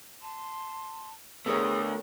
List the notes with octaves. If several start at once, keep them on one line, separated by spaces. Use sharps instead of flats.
A5 C6
D3 A3 B3 G4 G#4 A#4 C#5 D#6